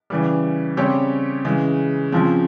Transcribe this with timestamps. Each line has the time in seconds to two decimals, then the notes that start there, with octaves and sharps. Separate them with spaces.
0.10 C#3 E3 G3
0.77 C#3 G3 C4 G4 C#5
1.45 C#3 E3 G#3
2.12 C#3 F3 C4